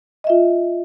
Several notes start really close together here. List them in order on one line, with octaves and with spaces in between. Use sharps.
D#5 E5 F4